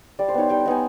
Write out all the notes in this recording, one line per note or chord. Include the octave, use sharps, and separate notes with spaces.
G3 D5
C5
B3 D#4 C#5
G3 G5
G5
B3 D#4 G#5